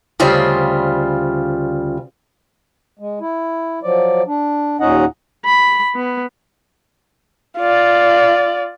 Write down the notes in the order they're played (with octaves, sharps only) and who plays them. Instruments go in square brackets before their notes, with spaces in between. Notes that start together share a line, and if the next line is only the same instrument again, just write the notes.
[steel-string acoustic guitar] D2 C#3 G3 F4 C5 E5
[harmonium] G#3
E4
F3 F#3 D5
D4
D#2 A#2 C#4 D#4 D#5 F#5
[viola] B5
B3
[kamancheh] F4 D5